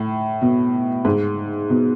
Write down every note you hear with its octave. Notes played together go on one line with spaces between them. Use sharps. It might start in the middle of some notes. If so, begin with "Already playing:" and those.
Already playing: A2
B2
G#2
B2